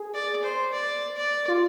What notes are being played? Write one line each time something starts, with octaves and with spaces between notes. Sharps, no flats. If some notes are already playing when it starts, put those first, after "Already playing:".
Already playing: G#4
D5
C5
D5
D5
F4